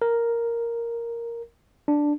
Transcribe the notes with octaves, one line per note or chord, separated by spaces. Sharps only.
A#4
D4